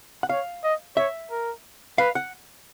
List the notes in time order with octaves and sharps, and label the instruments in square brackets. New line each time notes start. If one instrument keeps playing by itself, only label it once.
[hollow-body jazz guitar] F#5
[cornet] C#5 [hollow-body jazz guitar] F5
[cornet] D#5
[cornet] C#5 [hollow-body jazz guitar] E5
[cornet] A#4
[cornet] B4 [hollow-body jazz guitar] F5
[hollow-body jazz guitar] F#5